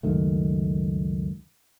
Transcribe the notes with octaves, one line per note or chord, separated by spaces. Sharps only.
C#2 F#2 D#3 A3